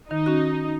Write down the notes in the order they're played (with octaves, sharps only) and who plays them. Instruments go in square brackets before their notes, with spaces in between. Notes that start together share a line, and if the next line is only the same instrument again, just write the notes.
[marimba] D#3 [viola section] D#4
[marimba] C#4 F#4